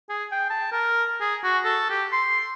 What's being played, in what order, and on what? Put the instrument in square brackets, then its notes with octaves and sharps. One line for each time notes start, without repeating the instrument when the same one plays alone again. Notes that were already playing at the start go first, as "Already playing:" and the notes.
[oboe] G#4
G5
A5
A#4
G#4
F#4
A4
G4
C6